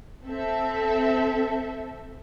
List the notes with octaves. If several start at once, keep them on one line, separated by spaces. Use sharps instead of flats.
C4 A4 E5